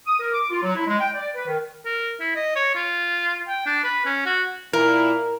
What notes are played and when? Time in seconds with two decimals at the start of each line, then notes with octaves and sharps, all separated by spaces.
0.06 D#6
0.20 A#4
0.33 D6
0.50 F4
0.62 F#3
0.75 E4
0.87 G#3
0.99 G5
1.15 D5
1.35 B4
1.46 D#3
1.85 A#4
2.20 E4
2.35 D#5
2.56 C#5
2.75 F4
3.48 G5
3.66 D4
3.84 B4
4.05 C#4
4.26 F#4
4.73 A#2 E4 A#4